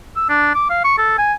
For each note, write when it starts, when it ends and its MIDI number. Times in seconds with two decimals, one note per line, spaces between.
0.16 0.25 88
0.29 0.54 62
0.55 0.66 86
0.70 0.84 77
0.85 0.96 85
0.98 1.13 69
1.18 1.34 80